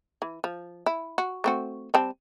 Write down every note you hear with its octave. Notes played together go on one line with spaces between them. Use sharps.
E3
F3
E4
F#4
A3 C4 F#4
G3 C4 A5